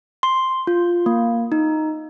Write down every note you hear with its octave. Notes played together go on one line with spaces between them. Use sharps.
C6
F4
A#3
D#4